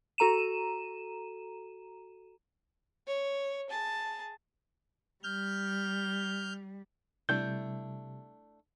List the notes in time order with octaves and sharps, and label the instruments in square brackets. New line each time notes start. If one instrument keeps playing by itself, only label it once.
[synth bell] F#4 A4 A#5 D#7 E7
[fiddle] C#5
G#4 A5
[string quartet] G3 [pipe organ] F6 G6
[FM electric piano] C3 G3 [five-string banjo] A3 D4 E4 [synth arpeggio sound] G6